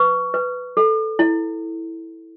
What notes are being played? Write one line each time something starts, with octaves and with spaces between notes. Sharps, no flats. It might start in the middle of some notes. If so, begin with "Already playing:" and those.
Already playing: B4 C#6
B4
A4
E4